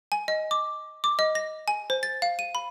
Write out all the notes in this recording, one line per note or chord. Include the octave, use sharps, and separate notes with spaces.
G#5
D#5
D6
D6
D#5
A#6
G#5
C5
A6
F5
D#7
B5